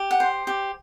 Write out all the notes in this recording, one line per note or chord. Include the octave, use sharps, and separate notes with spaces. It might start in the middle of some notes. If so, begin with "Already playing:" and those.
Already playing: G4
F#5
C5
G4